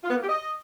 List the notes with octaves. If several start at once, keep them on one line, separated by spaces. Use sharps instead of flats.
F4
B3
A#3
G4
D#5